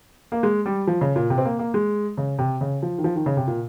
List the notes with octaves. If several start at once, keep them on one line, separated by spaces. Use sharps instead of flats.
A#3
G#3
G3
F3
C#3
A#2
C3
C4
A#3
A#3
G#3
C#3
C3
C#3
F3
D#3
F3
D#3
C#3
C3
A#2